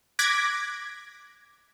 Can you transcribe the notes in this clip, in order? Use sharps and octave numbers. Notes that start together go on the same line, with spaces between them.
D6 F#6 G#6 A#6 B6 D7